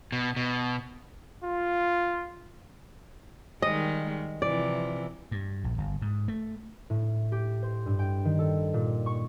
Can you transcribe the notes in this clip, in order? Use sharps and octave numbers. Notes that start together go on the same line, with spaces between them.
B2
B2
F4
D#3 G3 G#3 D#5
C3 E3 F3 D5
G2
A#1
G1
G#2
A3
A2
G4
C5
G2
G5
D#3
A4
A#2
C#6